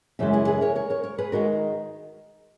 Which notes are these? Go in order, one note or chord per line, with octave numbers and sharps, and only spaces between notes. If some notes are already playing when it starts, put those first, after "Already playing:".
F#2 C#3 E3 G#3 E5
E4 G#4
G#4 B4
A#4 C#5
A#4 C#5
A#4 C#5
A#4 C#5
G#4 B4
D#3 G#3 F#4 A#4